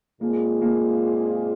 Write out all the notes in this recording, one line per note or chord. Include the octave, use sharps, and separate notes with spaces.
A#2 G#3 A#3 C4 F4 G#4
A#3